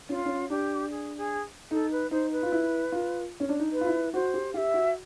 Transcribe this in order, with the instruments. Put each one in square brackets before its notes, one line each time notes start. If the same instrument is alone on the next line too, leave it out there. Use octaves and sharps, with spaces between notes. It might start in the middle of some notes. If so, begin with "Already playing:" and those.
[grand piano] C#4 [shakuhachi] F4
[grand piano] C#4
[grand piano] D4 [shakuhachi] G4
[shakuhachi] G#4
G#4
[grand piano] D#4 [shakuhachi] A4
[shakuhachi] B4
[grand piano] D#4 [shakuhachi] C5
[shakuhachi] B4
[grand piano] F4
E4
F4
C#4
D4
D#4
[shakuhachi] B4
[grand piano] F4
E4
[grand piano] F#4 [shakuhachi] C5
[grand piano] G4
[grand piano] G4 [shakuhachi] E5 F5
[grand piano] F#4